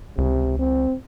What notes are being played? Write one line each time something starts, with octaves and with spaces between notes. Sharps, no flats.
C#2 C3
C4